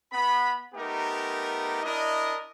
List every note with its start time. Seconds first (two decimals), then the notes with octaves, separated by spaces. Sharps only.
0.11 B3 B5
0.74 A3 B3 D#4 G4 A#4
1.83 D4 E4 A#4 D#5